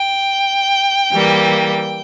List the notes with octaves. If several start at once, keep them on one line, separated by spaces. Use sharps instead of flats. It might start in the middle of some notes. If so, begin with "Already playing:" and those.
Already playing: G5
E3 G3 A#3